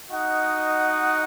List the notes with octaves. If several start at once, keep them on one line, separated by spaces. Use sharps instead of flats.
D#4 F#4 D#5 F#5